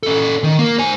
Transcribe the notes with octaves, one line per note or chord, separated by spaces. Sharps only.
C#4 A4
D#3
A#3 A#4
C5 G#5